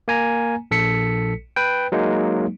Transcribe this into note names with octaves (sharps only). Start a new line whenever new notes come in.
A#3 G#5 A#5
A#1 A4 B6 C#7
B4 G5
F#3 G#3 A#3 D#4